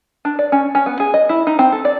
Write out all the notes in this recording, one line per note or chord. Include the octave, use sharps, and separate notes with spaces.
D4
D5
C#4
C#4
B3
G#4
D#5
E4
D#4
C4
A4
D5